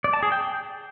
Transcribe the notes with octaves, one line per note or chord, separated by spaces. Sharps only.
D5
A5
G#4
G5